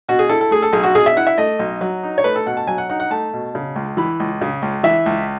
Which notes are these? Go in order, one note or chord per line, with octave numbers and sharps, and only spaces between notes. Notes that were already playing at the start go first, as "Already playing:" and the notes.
B2 F#4
G#4
E4 A4
A4
A3 G#4
A4
B1 G#4
F#4
B2 G#4
E5
E4 F#5
E5
A3 D#5
B1
F#3
D#4
C#5
A3 B4
A4
B2 F#5
A5
F#3 G#5
F#5
D#4 F#5
F#5
A3 A5
B2
C#3
C#2
E3 B5
C#2
C#3
C#2
E3 E5
C#2